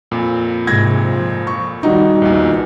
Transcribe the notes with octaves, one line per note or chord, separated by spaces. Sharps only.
F2 A#2
G#2 C3 G#6 A#6
F3
C#6
D#3 G3 D#4 F#4
A#1 E2 A#2